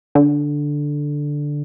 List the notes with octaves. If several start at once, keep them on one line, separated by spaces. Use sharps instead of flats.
D3